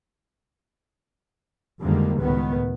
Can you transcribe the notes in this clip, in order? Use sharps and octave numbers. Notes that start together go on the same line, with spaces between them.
F2 D3 D#3 G3 G#3 A#3
C#2 A2 D#3 B3